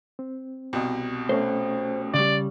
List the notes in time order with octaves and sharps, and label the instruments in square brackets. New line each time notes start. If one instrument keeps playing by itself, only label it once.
[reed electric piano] C4
[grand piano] C2 B2
[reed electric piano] A3 C#4 [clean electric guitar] C5
[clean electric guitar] C#3 G3 [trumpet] D5